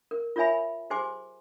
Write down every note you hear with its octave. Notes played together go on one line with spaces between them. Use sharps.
A#4
F4 A#4 C#5 E5 G#5 B5
G4 G#4 C5 G#5 C6 D6